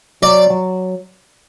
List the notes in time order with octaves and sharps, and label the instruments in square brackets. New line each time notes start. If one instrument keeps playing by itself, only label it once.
[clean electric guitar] F#3 [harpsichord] D5
[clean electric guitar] F#3